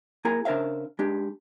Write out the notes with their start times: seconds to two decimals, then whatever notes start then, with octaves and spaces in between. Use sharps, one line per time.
0.25 A#3 E4 G#4 A#4 G#5 A#5
0.45 C#3 D4 A#4 C5 E5 F5
0.99 G#3 D4 G4